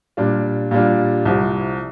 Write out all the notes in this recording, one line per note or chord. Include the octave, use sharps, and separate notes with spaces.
A#2 G3 D4 F4
A#2 G3 D4 F4
C2 C3 F3